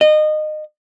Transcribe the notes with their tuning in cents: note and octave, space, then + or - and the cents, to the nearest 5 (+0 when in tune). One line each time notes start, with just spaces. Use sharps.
D#5 -25